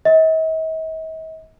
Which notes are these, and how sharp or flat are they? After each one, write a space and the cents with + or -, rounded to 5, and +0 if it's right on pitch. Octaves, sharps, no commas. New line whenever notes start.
D#5 +45